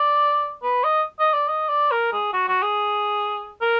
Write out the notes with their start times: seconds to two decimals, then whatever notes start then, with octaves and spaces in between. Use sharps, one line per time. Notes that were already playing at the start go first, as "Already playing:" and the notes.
Already playing: D5
0.63 B4
0.84 D#5
1.20 D#5
1.33 D5
1.49 D#5
1.69 D5
1.91 A#4
2.13 G#4
2.34 F#4
2.48 F#4
2.62 G#4
3.62 A#4